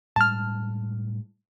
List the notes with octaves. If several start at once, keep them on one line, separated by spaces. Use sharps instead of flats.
A2 G3 G#3 A5 F6